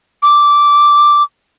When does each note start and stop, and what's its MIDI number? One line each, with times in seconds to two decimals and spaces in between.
0.22 1.23 86